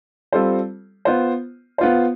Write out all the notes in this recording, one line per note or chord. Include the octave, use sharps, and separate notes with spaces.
G3 C4 F4 A4 C5
B3 F4 C5
B3 F4 C5